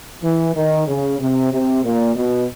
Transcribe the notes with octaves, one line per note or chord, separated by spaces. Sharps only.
E3
D#3
C#3
C3
C3
A#2
B2